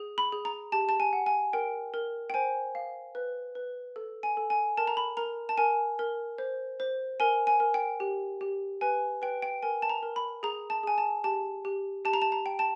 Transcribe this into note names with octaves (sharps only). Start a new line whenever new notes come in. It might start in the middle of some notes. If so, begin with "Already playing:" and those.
Already playing: G#4
B5
G#4
A#5
G4 A5
A5
G#5
F#5
G#5
A#4 G5
A#4
G5
C5 G#5
F5
B4
B4
A4
G#5
A4
G#5
A#4 A5
A#5
B5
A#4 A#5
A5
A#4 G#5
A#4
C5
C5
A#4 G#5
G#5
A#4
G5
G4
G4
B4 G#5
B4 G5
G5
A#4 G#5
A5
A#5
A#4
B5
G#4 A#5
A5
G#4 G#5
A5
G4 A5
G4
G4 A5
A#5
A5
A#5
G5
A5